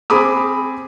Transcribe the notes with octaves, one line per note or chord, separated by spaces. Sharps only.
C4 G#4 B5 D6 D#6